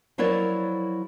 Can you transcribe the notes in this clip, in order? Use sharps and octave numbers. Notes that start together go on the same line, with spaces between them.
F3 F#3 E4 A#4 C#5 D5